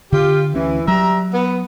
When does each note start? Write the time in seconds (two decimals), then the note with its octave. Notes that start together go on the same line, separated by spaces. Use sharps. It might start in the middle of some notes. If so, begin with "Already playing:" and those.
0.12 D3 F4 G4
0.54 D2 E3 C#4
0.88 F#3 G3 E5 A#5
1.33 B3